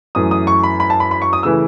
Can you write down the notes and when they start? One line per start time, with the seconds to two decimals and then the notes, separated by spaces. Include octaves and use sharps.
0.15 F#2 E3 A3 D#6
0.31 D#6
0.47 C#6
0.63 B5
0.80 B5
0.90 A5
1.00 B5
1.11 B5
1.22 C#6
1.33 D#6
1.43 C#3 E3 A3 E6